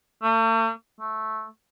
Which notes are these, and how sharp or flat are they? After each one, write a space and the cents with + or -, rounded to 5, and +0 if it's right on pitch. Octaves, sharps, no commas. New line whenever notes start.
A3 +45
A3 -10